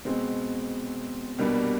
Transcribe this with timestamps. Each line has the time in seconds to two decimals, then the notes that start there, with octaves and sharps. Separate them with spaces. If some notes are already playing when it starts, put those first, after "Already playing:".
0.05 B2 G#3 C4
1.38 C2 B2 G3 A#3 D4